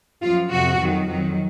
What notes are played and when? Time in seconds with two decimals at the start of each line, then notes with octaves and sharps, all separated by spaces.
0.22 F#2 F3 F4
0.50 F2 C3 F3 F#4
0.79 F2 D#3 F#3
1.07 F2 D#3 F#3